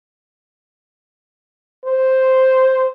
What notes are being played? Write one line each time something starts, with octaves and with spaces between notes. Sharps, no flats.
C5